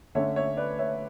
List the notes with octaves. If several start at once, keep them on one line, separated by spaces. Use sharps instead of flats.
D3 A3 C#4 C#5 E5
C#5 E5
B4 D5
C#5 E5